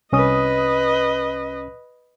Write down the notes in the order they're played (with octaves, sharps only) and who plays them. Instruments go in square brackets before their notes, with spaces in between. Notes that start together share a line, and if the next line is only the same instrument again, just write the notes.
[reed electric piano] C2 C#4 D#6 [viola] B4 D#5